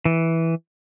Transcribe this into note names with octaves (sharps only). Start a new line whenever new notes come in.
E3